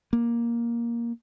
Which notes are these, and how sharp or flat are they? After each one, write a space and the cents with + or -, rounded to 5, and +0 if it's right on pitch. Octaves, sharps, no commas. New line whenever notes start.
A#3 +10